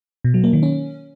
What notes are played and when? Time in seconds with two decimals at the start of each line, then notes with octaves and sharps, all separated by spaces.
0.24 B2
0.34 F#3
0.44 A#3
0.53 D#3
0.63 C#4